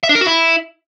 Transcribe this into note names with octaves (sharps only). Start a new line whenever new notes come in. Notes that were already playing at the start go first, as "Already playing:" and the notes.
E5
D4
A#4
F#4
E4